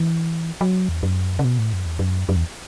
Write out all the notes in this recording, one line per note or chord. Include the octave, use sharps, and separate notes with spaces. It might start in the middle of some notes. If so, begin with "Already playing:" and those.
Already playing: E3
F#3
E2
F#2
C#3
B2
A2
F#2
E2
F#2
F#2
E2